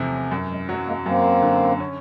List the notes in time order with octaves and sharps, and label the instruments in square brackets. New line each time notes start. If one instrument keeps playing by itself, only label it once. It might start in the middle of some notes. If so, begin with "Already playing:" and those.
Already playing: [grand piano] E2 C3 F3 A3
[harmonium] F#3
[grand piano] F#2 [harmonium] G3
[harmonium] F#3 G#3
[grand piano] F#3 [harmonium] G3 A3
[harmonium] G#3 A#3
[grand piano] F#2 [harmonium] A#3 C4
[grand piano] D3
C#4